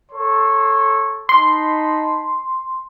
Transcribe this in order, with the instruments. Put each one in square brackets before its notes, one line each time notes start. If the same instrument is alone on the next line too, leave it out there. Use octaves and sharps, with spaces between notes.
[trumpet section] A4 C#5 C6
[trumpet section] D#4 A5 B5 [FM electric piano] C6